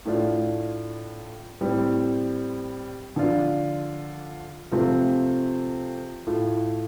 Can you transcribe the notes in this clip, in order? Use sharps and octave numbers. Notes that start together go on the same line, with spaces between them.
A2 A3 D4 F4
A2 G3 C4
D3 F3 D4 F4
C3 F3 A3 C4 F4
A2 A3 F4